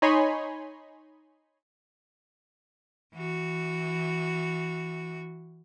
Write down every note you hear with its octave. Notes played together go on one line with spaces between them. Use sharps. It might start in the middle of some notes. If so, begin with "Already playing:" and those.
D#4 C#5 D#5 G#5 B5 C6
E3 F#4